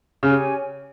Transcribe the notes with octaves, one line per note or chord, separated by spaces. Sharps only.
C#3 G4 C#5 G#5